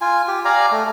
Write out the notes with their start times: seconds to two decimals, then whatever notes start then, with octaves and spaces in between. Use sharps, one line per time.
0.01 F4 G#5
0.28 G4
0.45 D5 F5 G#5 A#5
0.72 A3